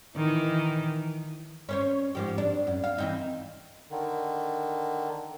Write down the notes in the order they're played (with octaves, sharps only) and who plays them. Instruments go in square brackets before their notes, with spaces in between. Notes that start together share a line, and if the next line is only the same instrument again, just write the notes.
[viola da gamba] D#3 E3
[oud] C#4 C5 C#5
G#2 F3 G4
D4
F#2
F5
E3 C4 D#4
[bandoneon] D3 D#3